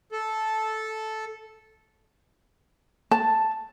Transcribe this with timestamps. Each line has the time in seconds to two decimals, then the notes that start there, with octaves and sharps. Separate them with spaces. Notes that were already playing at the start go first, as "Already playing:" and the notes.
0.12 A4
3.11 A5